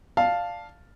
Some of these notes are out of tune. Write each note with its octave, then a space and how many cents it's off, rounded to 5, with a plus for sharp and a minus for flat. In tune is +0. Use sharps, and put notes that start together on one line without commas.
D5 +0 F5 +0 A5 +0